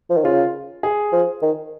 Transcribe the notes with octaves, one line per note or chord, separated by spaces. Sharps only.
F3
D#3
C#3 F4
G#4
F3
D#3